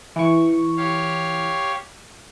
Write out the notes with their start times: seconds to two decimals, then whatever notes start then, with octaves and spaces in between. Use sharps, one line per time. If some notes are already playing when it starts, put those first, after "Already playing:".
0.16 E3 C#6
0.77 G4 C#5 F5